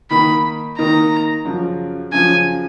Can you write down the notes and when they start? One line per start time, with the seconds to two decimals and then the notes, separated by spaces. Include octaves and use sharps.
0.10 D#3 A#3 D#4 B5
0.78 D#3 A#3 D#4 A#5
1.45 F#2 C#3 F3
2.12 F#2 C#3 F3 G#5